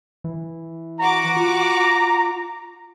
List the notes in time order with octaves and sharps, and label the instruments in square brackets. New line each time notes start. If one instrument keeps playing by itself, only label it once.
[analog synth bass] E3
[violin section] F#4 F#5 D6 [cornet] A#5
[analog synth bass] F4